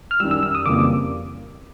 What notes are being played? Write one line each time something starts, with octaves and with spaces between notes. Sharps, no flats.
F6
F#2 D#3 G3 E6
E6
E6
D#6
F2 C#3 E3 G3 A#3 D6